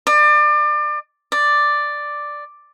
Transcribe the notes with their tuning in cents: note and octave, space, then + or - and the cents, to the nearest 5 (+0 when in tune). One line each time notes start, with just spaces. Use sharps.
D5 +30
D5 +5